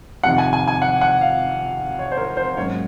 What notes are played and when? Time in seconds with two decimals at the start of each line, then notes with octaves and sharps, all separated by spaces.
0.23 F2 C3 D#3 F#5
0.38 G#5
0.53 G#5
0.68 G#5
0.82 F#5
1.01 F#5
1.21 F5
1.99 C#5
2.12 C5
2.17 A#4
2.37 C5
2.56 G#2 F#3 A#3 C#4 C#5